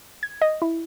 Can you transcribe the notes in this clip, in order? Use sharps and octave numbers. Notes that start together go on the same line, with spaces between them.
G#6
D#5
E4